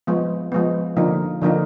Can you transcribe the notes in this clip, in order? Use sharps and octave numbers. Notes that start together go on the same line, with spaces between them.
F3 G#3 B3
F3 G#3 B3
D3 F3 A#3 D#4
D3 F3 A#3 D#4